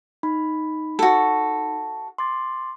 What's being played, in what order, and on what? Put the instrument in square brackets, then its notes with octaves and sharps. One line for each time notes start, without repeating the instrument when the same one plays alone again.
[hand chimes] D#4 B5
[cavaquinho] F#4 A4
[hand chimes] C6 D6 A6